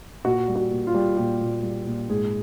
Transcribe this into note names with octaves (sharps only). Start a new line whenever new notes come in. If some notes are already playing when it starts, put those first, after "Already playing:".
A#2 F#4
G3
F#4
A#2
F4
G3
A#2 G4
A#2
G3
A#2
G#2 G#4